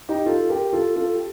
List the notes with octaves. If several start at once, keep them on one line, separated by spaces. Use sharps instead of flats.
D#4 G4
F4 A4
G4 A#4
F4 A4
F4 A4
G4